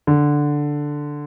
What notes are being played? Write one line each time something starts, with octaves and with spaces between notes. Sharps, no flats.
D3